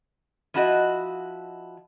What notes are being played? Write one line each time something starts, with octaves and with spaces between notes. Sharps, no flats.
F3 E4 F#4 D#5